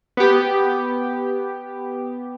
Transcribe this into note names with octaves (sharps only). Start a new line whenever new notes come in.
B3 G4